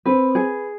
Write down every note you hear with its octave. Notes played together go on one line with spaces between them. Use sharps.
C4 B4
G#4